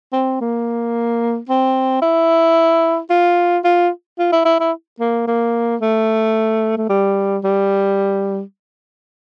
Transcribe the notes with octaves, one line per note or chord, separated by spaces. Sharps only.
C4
A#3
C4
E4
F4
F4
F4
E4
E4
E4
A#3
A#3
A3
A3
G3
G3